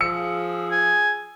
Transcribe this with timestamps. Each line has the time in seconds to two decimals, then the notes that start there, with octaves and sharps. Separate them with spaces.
0.01 F3 G#4 E6 C#7
0.71 G#5